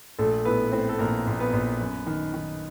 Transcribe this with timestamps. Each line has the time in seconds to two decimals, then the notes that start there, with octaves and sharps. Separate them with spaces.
0.18 A#1 A3 A4
0.45 A2 B3 B4
0.72 A2 C4 C5
0.89 A4
0.99 A#1 A#3 A#4
1.27 A#1
1.40 B3 B4
1.53 A#1
1.81 F#2
2.07 D#3
2.34 D#3